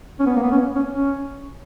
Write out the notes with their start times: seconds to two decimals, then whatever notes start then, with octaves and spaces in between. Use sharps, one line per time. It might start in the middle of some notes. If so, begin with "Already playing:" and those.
0.20 C#4
0.26 B3
0.36 A#3
0.43 B3
0.51 C#4
0.76 C#4
0.92 C#4